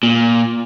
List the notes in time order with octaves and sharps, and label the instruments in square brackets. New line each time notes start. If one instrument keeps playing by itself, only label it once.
[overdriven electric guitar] A#2